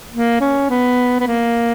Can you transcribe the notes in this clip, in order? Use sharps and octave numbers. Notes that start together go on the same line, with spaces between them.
A#3
C#4
B3
B3
A#3